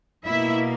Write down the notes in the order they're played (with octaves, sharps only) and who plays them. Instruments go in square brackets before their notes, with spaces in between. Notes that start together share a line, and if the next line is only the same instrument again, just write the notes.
[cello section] B2 A#3 E4 E5